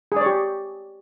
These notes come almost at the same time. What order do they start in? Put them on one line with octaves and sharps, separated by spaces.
G#4 D5 C#5 G4